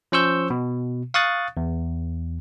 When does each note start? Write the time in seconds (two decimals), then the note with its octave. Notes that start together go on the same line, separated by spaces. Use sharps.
0.12 F3 C#4 C5 C#6 E6 G6
0.50 B2
1.14 F5 C#6 D#6 F#6 A6
1.57 E2